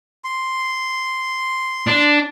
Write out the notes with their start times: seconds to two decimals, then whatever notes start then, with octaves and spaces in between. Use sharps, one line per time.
0.24 C6
1.88 D4